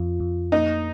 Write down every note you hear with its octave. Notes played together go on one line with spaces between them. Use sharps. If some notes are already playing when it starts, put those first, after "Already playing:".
Already playing: F2 F4
F2
A#3 D#4